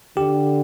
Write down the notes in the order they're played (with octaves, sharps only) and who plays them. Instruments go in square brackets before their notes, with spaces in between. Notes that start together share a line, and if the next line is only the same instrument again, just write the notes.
[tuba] D3 [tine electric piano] G4